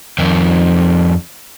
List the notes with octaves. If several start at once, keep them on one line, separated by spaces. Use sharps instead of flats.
F2 D#3